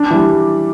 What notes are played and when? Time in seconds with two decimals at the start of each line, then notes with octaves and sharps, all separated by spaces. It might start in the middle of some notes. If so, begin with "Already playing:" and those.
Already playing: D4
0.11 E3 G3